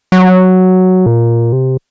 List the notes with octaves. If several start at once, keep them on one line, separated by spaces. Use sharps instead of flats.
F#3
A#2
C3